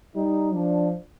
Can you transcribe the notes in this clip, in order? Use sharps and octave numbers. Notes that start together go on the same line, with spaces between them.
G3 D#4
F3 D4